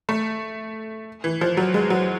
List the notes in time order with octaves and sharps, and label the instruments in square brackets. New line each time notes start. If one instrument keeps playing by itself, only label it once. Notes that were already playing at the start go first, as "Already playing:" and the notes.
[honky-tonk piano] A3
E3
F3
F#3
G#3
F#3